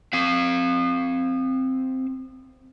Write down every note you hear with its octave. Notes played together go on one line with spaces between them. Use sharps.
C4 F5